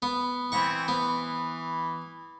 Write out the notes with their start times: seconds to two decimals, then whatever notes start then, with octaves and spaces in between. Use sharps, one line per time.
0.02 B3
0.52 E3 C4 F#5 B5 C#6
0.88 E3 B3